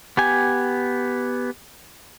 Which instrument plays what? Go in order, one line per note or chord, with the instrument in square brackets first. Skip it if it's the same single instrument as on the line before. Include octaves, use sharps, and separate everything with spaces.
[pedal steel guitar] B3 G4 G#5